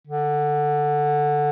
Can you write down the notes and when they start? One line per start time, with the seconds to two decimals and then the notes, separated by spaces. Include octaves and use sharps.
0.07 D3